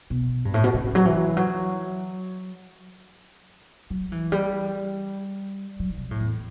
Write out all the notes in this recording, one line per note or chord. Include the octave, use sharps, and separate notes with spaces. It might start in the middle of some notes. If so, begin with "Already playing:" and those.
B2
G2
A2
B2
C#3
F#3
E3
F#3
F#3
E3
G3
F#3
B2
A2
E2